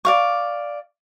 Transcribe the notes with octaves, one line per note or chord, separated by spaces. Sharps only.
D5 F5 C#6